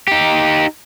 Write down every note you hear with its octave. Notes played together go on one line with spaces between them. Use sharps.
D#4 G4